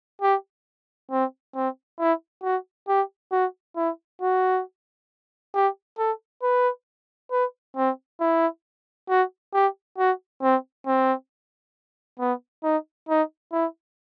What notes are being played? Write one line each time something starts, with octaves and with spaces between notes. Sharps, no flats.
G4
C4
C4
E4
F#4
G4
F#4
E4
F#4
G4
A4
B4
B4
C4
E4
F#4
G4
F#4
C4
C4
B3
D#4
D#4
E4